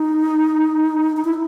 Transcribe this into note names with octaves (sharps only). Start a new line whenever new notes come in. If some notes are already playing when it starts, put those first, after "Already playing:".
Already playing: D#4
D#4
E4